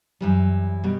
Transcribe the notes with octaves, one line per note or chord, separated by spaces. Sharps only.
F#2 E3 G3
B2 G3